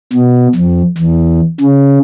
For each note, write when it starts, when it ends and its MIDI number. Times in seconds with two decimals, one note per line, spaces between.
0.13 0.48 47
0.55 0.82 41
0.98 1.41 40
1.60 1.99 49